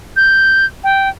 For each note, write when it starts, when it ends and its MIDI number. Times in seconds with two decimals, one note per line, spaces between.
0.16 0.66 91
0.84 1.09 79